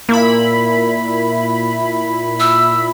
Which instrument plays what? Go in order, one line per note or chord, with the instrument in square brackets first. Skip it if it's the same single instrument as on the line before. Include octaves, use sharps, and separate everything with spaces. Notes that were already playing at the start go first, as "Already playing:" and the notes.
[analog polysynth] A#2 E4 B5 [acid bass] A#3
[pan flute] E6